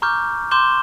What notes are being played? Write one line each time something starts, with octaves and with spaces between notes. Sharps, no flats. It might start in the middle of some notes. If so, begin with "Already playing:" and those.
A#5 C#6 D6 F6 G6
C6 D6 G6 E7 G7